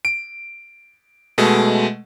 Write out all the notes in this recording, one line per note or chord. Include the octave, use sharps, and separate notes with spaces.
D7
B2 G#3 A3